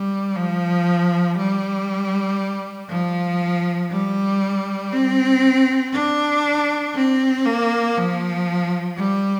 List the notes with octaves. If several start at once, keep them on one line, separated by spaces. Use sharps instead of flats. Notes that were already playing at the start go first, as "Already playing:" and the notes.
Already playing: G3
F3
G3
F3
G3
C4
D4
C4
A#3
F3
G3